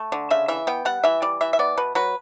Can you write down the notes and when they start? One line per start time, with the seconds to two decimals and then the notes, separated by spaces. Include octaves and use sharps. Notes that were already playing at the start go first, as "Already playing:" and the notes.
Already playing: A3
0.12 D3
0.30 C#3 E5
0.48 E3 E5
0.67 B3 G5
0.85 G3 F#5
1.04 E3 E5
1.22 G3 D5
1.41 E3 E5
1.53 E5
1.59 B3 D5
1.77 B2 B4
1.95 F#3 B4